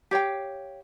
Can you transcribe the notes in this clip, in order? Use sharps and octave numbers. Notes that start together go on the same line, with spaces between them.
G4 C#5 F5 G5